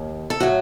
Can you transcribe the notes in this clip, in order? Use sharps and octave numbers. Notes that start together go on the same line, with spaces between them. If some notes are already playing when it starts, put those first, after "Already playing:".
Already playing: D#2
A4
A2 F#3 F#4